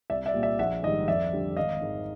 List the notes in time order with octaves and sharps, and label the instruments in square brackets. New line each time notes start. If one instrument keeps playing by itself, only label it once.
[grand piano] C2 D5 E5
D5 E5
A#2 G3
D5 E5
A#1 E5 F#5
G#2 D#3 G3 D#5
F2 D5 E5
D3 G3
G#1 D#5 F5
G#2 D#3